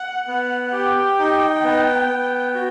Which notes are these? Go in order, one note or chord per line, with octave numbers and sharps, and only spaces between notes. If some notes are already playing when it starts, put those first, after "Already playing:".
Already playing: F#5
B3
G4 G5
D#4
B3
B3
F#4